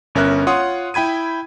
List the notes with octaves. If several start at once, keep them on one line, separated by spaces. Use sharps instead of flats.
G1 C#4 A#4 E5 F#6
F4 C#5 F#5 C6 D#6
E4 G5 B5 G#6 D#7